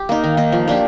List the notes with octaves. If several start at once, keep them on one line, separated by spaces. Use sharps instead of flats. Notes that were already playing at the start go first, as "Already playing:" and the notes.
Already playing: G4
A#3 D#4
D#3
A#3 D#4
F3
A#3 D4 G4